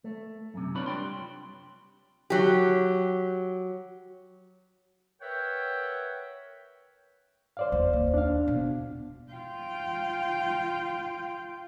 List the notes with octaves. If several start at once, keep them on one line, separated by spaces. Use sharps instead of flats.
A3
F#2 C3
D4 F4 B4 C#5 D5 B5
G3 G5 C6
F#3 G4
A#4 B4 C#5 E5 F#5 G5
C5 D5 F5
E2
D#2
D4 F5
B2
F4 G5